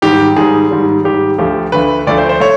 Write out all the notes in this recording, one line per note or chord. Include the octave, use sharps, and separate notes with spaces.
G#2 D#3 G3 G4
G#2 D#3 G3 G#4
G#2 D#3 G3
G#2 D#3 G3 G4
D2 D3 F3 A3 G4
D2 D3 F3 A3 B4
D2 D3 F3 A3 D5
C5
C5
A3 C#5